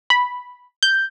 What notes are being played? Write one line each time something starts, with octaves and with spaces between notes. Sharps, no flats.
B5
G6